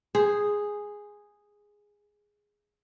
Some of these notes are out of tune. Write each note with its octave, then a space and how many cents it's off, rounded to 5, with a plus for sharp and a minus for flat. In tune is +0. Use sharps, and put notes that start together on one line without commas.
G#4 -5 C5 +0